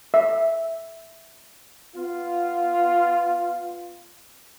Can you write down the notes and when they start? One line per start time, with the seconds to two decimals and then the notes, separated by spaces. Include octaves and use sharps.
0.14 E5
1.95 B3 F4